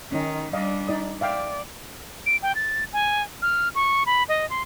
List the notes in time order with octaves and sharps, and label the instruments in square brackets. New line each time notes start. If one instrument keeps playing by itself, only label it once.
[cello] D#3 [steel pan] C#4 D#4
[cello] G3 D4 [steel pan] D5 D#5 F5
[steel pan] D#4 D5 D#6
[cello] D5 [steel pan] E5 F5 G5
[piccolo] D7
G5
A6
G#5
F6
C#6
B5
D#5
C6